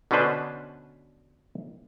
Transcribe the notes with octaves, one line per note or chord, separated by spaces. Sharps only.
B2 D3 C#4 D4 B4 C5